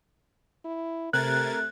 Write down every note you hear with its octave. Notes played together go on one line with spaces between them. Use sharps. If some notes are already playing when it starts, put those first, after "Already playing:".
E4
C3 A3 A#4 F#6 G#6 A6